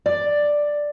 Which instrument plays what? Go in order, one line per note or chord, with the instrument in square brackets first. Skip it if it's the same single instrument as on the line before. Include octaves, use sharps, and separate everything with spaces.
[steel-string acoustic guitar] D5